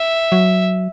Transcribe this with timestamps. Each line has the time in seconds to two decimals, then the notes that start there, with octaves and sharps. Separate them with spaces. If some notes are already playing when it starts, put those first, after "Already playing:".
Already playing: E5
0.32 F#3